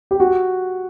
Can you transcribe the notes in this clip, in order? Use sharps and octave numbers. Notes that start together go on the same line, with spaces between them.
G4
F#4